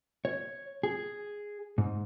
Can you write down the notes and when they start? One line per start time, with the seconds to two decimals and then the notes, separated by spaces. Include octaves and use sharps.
0.25 C#5
0.83 G#4
1.78 G#2